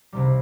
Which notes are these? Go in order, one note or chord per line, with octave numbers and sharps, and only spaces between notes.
C2 C3 D#3 G3